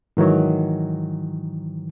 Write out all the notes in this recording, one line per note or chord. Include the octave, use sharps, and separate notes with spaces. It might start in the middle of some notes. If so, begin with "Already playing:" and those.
G#2 D#3 E3 F#3